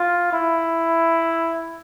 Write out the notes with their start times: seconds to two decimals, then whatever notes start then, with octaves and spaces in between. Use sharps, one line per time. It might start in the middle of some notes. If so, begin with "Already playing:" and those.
Already playing: F4
0.33 E4